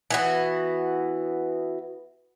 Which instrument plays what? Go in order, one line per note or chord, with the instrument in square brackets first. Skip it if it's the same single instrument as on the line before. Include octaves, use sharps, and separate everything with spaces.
[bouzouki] E3 B3 F#4